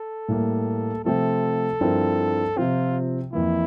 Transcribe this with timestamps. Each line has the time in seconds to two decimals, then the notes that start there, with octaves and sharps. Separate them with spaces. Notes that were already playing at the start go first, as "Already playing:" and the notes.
Already playing: A4
0.28 A2 G3 A#3
1.04 C3 F3 A3 C4 F4 A4
1.81 G2 F3 C4 E4 A#4
2.56 C3 F3 C4 F4
3.33 F2 E3 A#3 E4